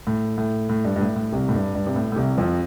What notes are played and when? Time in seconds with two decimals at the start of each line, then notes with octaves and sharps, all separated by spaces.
0.07 A2
0.38 A2
0.69 A2
0.85 G2
0.96 G2
1.01 A2
1.16 A2
1.32 C2 C3
1.49 A2
1.54 G2
1.75 G2
1.87 C3
1.96 A2
2.12 A2
2.16 C2 C3
2.37 F2 F3